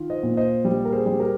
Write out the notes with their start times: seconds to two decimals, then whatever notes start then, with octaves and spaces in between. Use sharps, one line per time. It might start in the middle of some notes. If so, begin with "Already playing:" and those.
Already playing: D#3 F4
0.10 C5 D#5
0.23 A#2
0.37 C5 D#5
0.65 G3
0.85 A#4
0.92 G#4 C5
1.06 G3
1.20 G4 A#4